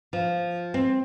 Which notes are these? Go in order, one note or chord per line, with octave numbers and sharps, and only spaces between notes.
F3
C4